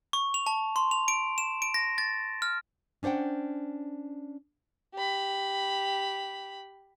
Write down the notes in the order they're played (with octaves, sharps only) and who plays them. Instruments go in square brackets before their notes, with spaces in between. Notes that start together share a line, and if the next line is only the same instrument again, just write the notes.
[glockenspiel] C#6
F7
A5
C6
F7
D7
E7
D7
A#6
A6
F6
[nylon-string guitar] C#4 D4 C5 F#5 G5
[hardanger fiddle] G4 B5